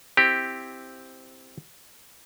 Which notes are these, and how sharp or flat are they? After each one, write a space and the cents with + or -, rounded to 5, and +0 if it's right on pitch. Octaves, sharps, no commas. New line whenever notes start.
C4 +0 E4 +0 G4 +0